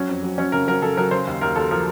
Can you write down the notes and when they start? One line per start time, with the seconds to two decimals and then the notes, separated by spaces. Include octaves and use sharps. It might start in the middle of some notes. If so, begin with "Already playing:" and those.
Already playing: F#3 C#4
0.09 F2
0.23 F#3
0.38 F#3 C#4
0.52 C#3 A#4
0.67 F#3 A#4
0.82 C#3 A4
0.97 F#3 A#4
1.11 C#3 C5
1.27 D#2
1.41 D#2 A#4
1.56 D#2 A4
1.71 F3 A#4